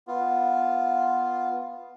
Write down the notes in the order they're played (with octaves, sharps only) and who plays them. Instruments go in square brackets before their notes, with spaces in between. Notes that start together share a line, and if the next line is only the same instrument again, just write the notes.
[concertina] B3 F4